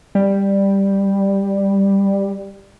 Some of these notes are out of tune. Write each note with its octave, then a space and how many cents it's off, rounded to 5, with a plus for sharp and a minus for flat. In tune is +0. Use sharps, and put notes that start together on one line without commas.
G3 +10